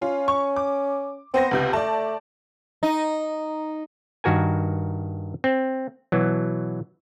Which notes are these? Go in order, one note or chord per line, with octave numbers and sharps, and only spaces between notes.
C#4 F4
C#6
D6
B3 C4 C5 A#6
C#2 C3 B3 G6
A3 D5 A5
D#4
G2 D#3 F#4 A#4 G#5
C4
B2 E3 F#3